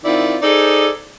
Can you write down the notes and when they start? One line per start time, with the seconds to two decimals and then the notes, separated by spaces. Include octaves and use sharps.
0.04 D#3 C4 E4 F4 D5
0.42 D#4 G#4 A4 C5 D5